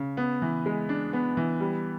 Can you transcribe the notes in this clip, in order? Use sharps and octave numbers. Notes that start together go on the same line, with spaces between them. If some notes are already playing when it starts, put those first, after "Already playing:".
Already playing: C#3
B3
E3
G#3
D4
B3
E3
G3